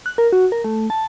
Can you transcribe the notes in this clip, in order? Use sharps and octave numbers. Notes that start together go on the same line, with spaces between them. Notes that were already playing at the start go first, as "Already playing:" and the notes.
F#6
A#4
F#4
A#4
A3
A5